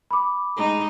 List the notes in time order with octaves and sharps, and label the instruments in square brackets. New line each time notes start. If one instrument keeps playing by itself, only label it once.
[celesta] B5 D6
[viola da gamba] G#3 D#4